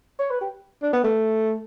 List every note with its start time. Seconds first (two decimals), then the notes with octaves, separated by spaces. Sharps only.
0.19 C#5
0.30 B4
0.41 G4
0.83 D4
0.93 B3
1.04 A3